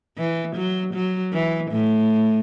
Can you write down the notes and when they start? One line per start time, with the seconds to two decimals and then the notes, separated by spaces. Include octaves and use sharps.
0.17 E3
0.56 F#3
0.94 F#3
1.33 E3
1.71 A2